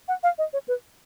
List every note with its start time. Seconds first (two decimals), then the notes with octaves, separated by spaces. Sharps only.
0.08 F#5
0.23 F5
0.38 D#5
0.53 C#5
0.68 B4